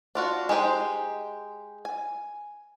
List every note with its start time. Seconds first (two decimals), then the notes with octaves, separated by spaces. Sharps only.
0.15 D4 F4 F#4
0.49 G#3 D#4 G4 C5
1.85 G#5